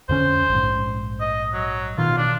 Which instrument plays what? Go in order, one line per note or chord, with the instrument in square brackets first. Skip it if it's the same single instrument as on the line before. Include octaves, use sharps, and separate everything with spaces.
[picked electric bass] F2 D3 C#4 [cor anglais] C5
[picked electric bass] A#1 G#2
[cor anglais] D#5
F#3
[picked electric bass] B2 D#3 [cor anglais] F4
[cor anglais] D4